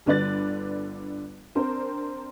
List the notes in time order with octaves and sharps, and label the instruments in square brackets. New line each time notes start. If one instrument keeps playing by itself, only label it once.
[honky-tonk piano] G1 D3 B4 D5 F#6 A6
C4 D4 A#4 C5